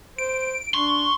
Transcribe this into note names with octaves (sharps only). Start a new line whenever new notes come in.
C5 D7
D4 C6 C#6